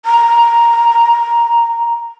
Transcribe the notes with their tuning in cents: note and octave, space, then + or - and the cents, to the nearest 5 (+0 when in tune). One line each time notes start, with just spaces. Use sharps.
A#5 +5